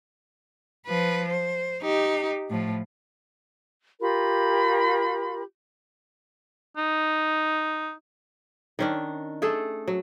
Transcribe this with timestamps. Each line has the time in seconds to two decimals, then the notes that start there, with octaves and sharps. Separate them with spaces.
0.87 F3 B4
1.29 C5
1.83 D#4 G4
2.50 A2 F3
4.00 F4 G4 A#4 B5
6.77 D#4
8.79 D#3 C#4 D4
9.42 A3 G#4 A4
9.88 F#3